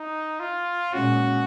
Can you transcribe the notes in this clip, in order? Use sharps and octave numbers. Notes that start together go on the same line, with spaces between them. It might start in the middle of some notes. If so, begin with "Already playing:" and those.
Already playing: D#4
F4
A#2 G#3 C#4 F#4